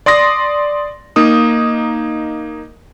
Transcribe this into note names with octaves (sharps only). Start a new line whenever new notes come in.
D5 C6 D#6 A#6
A#3 D#4 D#6